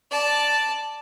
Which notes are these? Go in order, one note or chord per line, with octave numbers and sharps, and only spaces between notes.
D5 A5